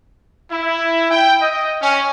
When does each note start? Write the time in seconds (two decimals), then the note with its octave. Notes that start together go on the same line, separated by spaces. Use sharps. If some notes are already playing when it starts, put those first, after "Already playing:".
0.52 E4
1.10 G5
1.41 D#5
1.81 C#4